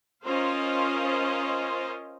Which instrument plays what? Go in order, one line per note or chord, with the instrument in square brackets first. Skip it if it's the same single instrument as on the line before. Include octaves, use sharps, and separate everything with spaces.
[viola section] C#4 F4 A#4 C5 D#5 F5